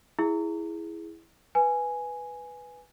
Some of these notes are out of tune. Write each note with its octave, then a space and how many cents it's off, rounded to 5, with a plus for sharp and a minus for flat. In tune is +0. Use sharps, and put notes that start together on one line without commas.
E4 +0 G#4 +0
B4 +0 G#5 +0